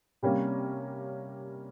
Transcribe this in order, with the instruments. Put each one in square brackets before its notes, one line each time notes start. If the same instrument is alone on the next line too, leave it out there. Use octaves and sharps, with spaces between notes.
[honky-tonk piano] C3 G3 A#3 C#4